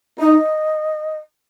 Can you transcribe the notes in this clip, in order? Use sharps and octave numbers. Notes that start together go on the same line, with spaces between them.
D#4 D#5